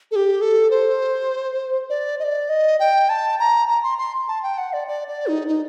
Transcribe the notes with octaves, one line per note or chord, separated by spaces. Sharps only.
A4
G4
A4
C5
D5
D#5
D5
D#5
G5
A5
A#5
A#5
C6
C6
A5
G5
F#5
D5
D5
D5
D#4
D#4